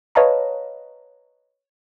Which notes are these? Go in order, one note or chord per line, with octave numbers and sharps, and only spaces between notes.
B4 C#5 D#5 F5 A5 A#5